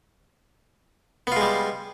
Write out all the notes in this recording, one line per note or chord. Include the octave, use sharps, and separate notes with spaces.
G3 G#3 B3 F4